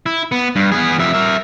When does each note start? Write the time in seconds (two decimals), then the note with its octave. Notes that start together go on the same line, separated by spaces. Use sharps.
0.06 E4
0.32 B3
0.56 G2
0.72 B3 G#4
0.99 F2 E5
1.14 A#4 E5